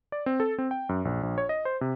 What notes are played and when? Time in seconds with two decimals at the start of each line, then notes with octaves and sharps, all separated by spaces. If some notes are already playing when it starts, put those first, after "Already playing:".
0.12 D5
0.26 C4
0.40 A4
0.58 C4
0.71 G5
0.89 F#2
1.05 A#1
1.23 A#1
1.38 C#5
1.49 D#5
1.65 C5
1.81 C3